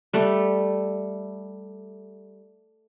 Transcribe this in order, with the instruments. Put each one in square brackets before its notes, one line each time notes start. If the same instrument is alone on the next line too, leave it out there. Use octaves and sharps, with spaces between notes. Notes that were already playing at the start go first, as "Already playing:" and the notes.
[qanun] G3 A3